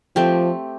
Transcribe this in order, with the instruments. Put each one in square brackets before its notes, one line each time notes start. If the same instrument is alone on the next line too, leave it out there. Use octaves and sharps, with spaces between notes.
[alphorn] F3 [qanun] A3 C4 G4